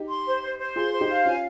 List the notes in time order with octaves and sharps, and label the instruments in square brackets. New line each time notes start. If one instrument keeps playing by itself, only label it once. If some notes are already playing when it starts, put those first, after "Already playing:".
Already playing: [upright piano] D#4 G4
[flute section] C6
C5
C5
C5
[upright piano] F4 G#4 [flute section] C6
[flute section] C5
[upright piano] D#4 G4
[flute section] F5
[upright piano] C#4 F4 [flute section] G#5